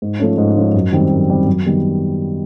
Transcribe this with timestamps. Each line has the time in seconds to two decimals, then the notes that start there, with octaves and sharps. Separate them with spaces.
0.02 G#2
0.20 F3 A3 C#4
0.38 G#2
0.57 F3 A3 C#4
0.74 F#2
0.93 D#3 G3 C4
1.11 F#2
1.29 D#3 G3 C4
1.46 F#2
1.66 D#3 G3 B3